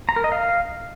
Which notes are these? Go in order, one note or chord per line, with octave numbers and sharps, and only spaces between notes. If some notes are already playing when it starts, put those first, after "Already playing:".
A#5
A#4
D#5
F5